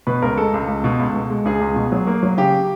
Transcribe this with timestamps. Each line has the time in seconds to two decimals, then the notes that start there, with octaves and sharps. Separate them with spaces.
0.07 B2 B4
0.22 C#2 A#4
0.38 G#3 A4
0.54 C#2
0.68 C#2
0.84 B2
0.99 C#2
1.15 B2
1.30 G#3
1.45 C#2 G#4
1.61 C#2
1.76 B2
1.92 F#3
2.07 A#3
2.23 F#3
2.38 C#3 G4